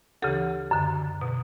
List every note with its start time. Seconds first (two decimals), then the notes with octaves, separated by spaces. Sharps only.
0.22 D2 C#3 E3 G4 A4
0.71 F#2 D3
1.21 B2